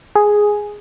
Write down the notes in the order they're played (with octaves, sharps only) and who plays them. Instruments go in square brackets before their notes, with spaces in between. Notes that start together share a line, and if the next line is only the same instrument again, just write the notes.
[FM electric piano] G#4